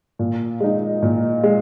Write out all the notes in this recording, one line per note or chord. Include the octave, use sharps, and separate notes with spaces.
A#2
G#3 D#4
A#2
G#3